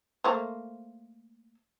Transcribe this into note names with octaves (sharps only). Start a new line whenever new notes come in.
A3 A#3 C5